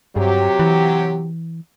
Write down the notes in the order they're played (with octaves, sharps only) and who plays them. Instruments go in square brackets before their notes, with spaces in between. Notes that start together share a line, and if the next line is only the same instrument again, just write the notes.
[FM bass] G2 [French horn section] C3 F#3 G4
[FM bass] E3